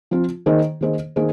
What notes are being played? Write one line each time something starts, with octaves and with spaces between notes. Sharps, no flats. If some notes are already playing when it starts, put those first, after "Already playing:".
F3 C4 F4
D#3 A#3 G#4 C5 D#5
D#3 A#3 G#4 C5 D#5
D#3 A#3 G#4 C5 D#5